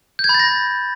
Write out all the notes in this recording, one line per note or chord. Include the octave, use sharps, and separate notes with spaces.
G6
G#6
B5
A6
A#6